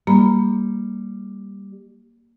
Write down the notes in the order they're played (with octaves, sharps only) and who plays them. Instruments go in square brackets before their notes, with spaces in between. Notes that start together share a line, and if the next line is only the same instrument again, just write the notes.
[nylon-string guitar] G3 [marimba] A#3 A#5 B5